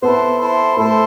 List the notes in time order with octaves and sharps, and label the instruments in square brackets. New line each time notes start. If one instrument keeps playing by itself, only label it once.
[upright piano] B3 [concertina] E4 A4 C5
[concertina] E4 A4 C5
[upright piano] A3 [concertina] E4 A4 C5